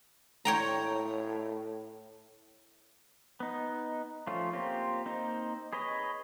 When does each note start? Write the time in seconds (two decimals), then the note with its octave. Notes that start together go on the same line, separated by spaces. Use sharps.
0.45 A2 C#5 G5 A#5
3.40 B3 D#4
4.27 F3 A3 C#4 F4
4.53 A#3 C4 F4 G4
5.06 A#3 C4 D#4
5.73 G#4 B4 C#5 D#5